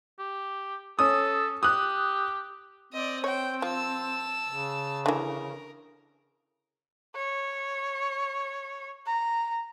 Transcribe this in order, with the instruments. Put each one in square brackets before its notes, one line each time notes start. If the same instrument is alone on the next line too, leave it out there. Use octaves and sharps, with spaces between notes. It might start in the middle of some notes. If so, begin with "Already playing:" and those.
[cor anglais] G4
[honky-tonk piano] C#4 D#6 [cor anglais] A4
[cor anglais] G4 [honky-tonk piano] D#6 F#6
[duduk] C4 [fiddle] D5 D#5
[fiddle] C5 G5 [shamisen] C#5
[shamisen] F3 [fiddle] A5 E6
[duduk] C#3
[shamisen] D3 E3 [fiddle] A#4
[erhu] C#5
A#5